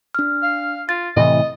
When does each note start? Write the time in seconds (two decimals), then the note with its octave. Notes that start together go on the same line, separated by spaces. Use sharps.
0.15 D4 F6
0.43 F5
0.89 F4 A6
1.17 A2 C3 E3 D#5